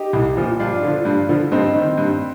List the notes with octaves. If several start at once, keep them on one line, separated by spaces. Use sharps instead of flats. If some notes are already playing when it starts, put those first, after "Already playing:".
Already playing: D#4 G4
C2
A#2 F3
G2 D4 F4
D3 F3
G2
D3 F3
G2 C4 D#4
D#3
G2